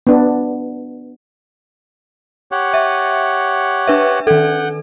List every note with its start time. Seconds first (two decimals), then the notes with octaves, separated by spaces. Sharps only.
0.07 B3 D4
2.52 G4 C#5 F#5
2.74 E5
3.87 D4 B4 E5
4.27 D#3 A4 F#5 G6